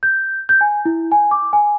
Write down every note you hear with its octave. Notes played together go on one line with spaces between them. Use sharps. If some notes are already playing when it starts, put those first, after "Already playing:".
G6
G6
G#5
E4
G#5
D6
G#5